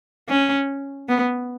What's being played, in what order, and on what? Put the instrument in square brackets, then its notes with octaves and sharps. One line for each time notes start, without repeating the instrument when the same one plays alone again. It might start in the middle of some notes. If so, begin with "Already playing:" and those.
[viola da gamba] C#4
B3